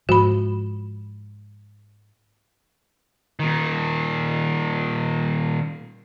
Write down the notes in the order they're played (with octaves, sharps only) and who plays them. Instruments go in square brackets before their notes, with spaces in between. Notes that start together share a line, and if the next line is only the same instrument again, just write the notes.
[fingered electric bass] G#2 F3 [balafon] F#4 B5
[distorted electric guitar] A#2 D#3